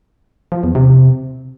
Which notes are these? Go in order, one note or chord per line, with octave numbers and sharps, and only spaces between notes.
F3
E2
C3